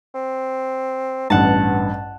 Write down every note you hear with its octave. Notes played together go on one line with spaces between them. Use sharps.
C4
A1 G2 B3 F#5 A5